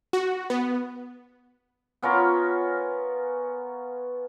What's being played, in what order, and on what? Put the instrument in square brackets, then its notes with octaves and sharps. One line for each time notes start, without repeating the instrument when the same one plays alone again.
[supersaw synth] F#4
B3
[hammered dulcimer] B3 C#4 F4 A#4